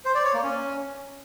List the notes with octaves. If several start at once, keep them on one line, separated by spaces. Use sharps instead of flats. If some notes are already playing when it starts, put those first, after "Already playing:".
C5
D5
C#5
A#3
C#4